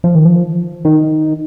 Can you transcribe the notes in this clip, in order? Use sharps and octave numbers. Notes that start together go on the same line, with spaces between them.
F3
D#3
F3
D#3